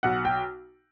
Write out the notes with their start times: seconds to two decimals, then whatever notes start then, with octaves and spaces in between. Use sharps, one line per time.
0.03 B1 F#5
0.25 G5